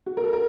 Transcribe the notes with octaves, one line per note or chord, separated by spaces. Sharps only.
F#4
A#4
A4
A#4